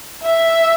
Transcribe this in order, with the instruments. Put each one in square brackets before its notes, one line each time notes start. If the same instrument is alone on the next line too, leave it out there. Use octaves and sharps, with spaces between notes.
[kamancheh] E5